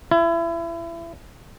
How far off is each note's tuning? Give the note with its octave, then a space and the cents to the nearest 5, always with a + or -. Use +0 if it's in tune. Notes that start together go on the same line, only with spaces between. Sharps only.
E4 +30